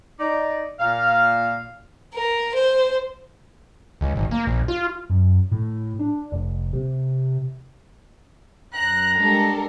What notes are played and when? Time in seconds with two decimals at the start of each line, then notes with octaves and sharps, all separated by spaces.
0.19 D#4 D5
0.80 A#2 F5
2.14 A#4
2.55 C5
4.01 C#2
4.16 G#1
4.31 A#3
4.47 A#1
4.68 F4
5.10 F#2
5.51 A2
5.99 D4
6.32 F1
6.73 C3
8.74 F#2 A#5 F#6
9.16 G3 G#3 D4 A4 A#4